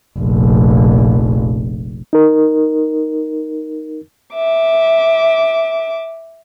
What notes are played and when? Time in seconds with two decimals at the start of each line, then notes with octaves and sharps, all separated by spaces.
0.19 F1 A#1
2.13 D#4 A#4
4.34 E5 D6